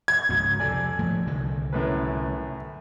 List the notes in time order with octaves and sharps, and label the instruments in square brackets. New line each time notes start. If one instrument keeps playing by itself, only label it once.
[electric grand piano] G#6
[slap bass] C#2 G#2 [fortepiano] F#3
[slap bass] F2 C3 [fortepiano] A4 D5 G#5
[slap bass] A2 F3 A3
C2 D3 D#3
[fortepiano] F#2 A2 B4